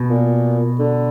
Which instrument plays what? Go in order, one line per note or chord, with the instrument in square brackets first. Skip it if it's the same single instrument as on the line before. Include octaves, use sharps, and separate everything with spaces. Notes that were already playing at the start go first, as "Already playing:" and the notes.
Already playing: [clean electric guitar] B2
[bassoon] A#2
D3